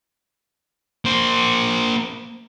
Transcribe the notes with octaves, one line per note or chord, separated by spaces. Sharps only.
A#3 C5